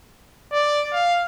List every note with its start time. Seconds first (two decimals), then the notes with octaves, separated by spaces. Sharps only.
0.53 D5
0.93 F5